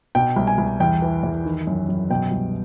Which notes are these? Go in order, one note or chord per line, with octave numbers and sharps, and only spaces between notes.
B2 G5
C2
G#5
C2
E2 G5
E3
E2
D#3
F#2
F#2
B2 G5
C2